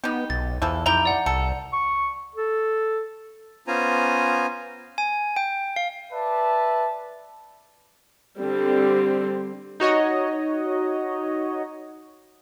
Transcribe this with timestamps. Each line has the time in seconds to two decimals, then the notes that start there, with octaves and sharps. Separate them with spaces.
0.04 B3 D#4 G4
0.30 B1 A6
0.62 E2 E3 F3 A4
0.86 F2 D#4 E4 G4 A#5 G6 G7
1.06 D5 F#5
1.26 C2 A4 C#7
1.73 C#6
2.35 A4
3.67 B3 C#4 F4 C5 G#5 A#5
4.98 G#5
5.36 G5
5.76 F5
6.12 B4 D5 E5 A5
8.41 D3 G3 C4
9.80 D#4 F#4 C#5 D#5